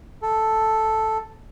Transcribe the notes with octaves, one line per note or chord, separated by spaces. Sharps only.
A4